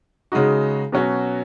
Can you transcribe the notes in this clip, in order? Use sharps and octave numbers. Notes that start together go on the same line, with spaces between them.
C#3 G#3 D#4 F#4
B2 F#3 C#4 F#4